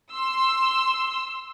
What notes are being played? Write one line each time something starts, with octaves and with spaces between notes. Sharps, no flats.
C6 E6